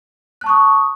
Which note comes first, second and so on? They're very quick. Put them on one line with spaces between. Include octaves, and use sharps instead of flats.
F#6 A5 C#6 D#6